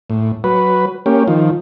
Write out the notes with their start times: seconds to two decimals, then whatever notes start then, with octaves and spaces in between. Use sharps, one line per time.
0.10 A2
0.44 F#3 B4
1.06 A#3 C#4 G4
1.28 D#3 F3